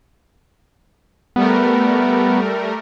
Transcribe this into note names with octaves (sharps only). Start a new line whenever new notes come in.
G3 A3 B3 A#4